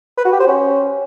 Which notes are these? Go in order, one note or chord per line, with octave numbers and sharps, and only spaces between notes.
B4
F#4
G4
C5
C#4